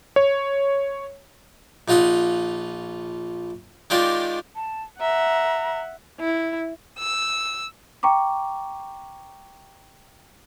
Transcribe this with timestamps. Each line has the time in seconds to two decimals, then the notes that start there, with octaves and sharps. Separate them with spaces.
0.16 C#5
1.88 A#1 D#4 F4 F#5 B5 D#6
3.90 D#3 G#3 F4 G4 D5
4.56 A5
5.00 E5 F#5 A#5
6.20 E4
6.99 E6
8.03 G5 A#5 C#6 D6